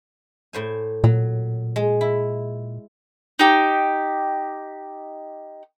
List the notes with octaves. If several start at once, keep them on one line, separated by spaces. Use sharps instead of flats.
A2 C5 G#5
A#2 F#3
G#3
E4
D#4 G4